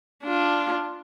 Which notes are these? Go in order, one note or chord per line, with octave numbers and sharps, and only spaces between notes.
D4 F4